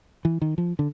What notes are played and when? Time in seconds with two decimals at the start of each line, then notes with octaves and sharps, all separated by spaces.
0.25 E3
0.42 D#3
0.58 F3
0.79 D3